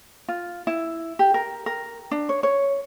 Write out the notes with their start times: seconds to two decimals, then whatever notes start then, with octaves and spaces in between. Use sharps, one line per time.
0.29 F4
0.67 E4
1.19 G4
1.34 A#4
1.66 A#4
2.11 D4
2.29 C#5
2.43 C#5